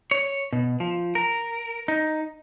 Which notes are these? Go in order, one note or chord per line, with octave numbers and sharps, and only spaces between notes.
C#5
B2
F3
A#4
D#4